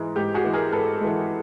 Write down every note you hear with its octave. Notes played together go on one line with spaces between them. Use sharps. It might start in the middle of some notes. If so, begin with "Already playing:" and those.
Already playing: G#2 E3 G#3
G#2 G4
F#4 G#4
E3 G#3
G#4 A#4
G#2 A4 B4
E3 G#3